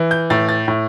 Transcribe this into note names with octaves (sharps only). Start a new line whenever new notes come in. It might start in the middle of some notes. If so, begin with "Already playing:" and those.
Already playing: E3
G6
A2 A6
A6
A2